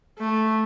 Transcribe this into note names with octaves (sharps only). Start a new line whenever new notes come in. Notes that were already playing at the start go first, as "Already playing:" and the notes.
A3